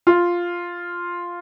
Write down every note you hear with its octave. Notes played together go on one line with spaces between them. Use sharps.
F4